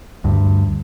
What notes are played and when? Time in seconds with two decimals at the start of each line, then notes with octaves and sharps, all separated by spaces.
0.24 D2 G2